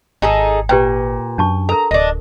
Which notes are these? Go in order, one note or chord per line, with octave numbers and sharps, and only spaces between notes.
G#1 D#4 G#4 A4
A#2 G4 B4 G5
F#2 D4 A5 C#6
A4 A#4 A#5
D1 D4 D#5